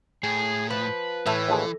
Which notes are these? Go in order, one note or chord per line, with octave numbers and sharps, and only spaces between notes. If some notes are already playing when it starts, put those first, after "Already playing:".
A2 G#4
F3 B4
A2 E3 A3
D#2 F3 G#4